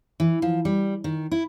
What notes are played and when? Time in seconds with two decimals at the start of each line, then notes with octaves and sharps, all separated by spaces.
0.20 E3
0.42 F3
0.65 G3
1.04 D#3
1.32 E4